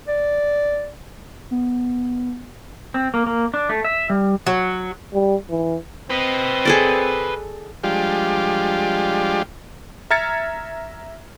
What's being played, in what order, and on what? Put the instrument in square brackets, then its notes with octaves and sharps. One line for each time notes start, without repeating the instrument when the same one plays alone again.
[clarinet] D5
[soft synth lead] B3
[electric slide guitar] C4
A#3
A#3
D4
A3
E5
G3
[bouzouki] F#3
[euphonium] G3
E3
[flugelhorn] C4 [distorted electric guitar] B4 D#5
[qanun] G#4 A4 D5
[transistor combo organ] F3 G3 G#3 D4 F4 G4
[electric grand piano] E5 A#5 F6 G#6 A6 C#7